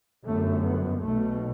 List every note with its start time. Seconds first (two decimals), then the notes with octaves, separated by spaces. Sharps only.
0.25 G1 F#2 A3
0.65 B3
1.05 B1 B2 A3